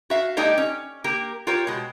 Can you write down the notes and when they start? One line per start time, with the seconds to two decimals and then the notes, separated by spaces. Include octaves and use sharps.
0.10 F#4 E5 F5
0.37 G#3 A#3 D#4 G4 A4 D5
0.58 C#4
1.04 A#3 G4 A#4
1.47 F4 G4 A#4 C#5
1.67 B2 G#3